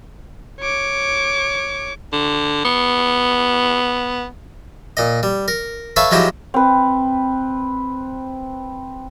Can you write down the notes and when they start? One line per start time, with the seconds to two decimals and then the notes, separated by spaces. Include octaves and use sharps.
0.61 C#5 D6
2.12 D3
2.65 B3
4.97 A#2 D#5
5.23 G3
5.48 A#4
5.96 A4 B4 C#5 E5 F5 A5
6.11 F3 F#3 G#3 E4 G4
6.54 C4 B4